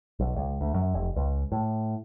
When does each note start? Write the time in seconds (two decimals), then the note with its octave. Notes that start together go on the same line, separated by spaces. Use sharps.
0.20 B1
0.36 C#2
0.61 D2
0.74 F#2
0.94 F1
1.16 C#2
1.52 A2